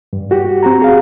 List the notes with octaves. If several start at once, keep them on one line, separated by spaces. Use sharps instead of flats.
G2
F#4 G4
C4 F#4 A#5
G#4 F5